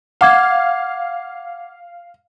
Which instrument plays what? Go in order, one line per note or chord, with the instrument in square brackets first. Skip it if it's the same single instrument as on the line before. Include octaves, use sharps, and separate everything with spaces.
[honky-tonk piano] F5 [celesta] F#5 D6 G#6